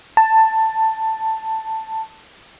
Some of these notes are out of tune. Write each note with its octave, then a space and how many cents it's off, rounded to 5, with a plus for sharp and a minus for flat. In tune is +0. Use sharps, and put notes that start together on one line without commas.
A5 +10